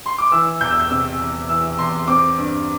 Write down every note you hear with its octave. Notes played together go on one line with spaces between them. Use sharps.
C6
D6
E3 E6
E2 G6
E6
G6
C3 E6
E2
E3 E6
E2 C6
C4 D6
G2